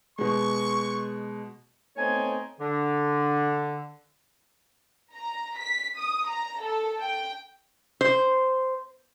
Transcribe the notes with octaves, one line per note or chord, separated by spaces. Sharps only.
B2 G#3 C#6
A3 B3 C4 D#4 C#5 G#5
D3
A#5
B6
D#6
A#5
A4
G5
C5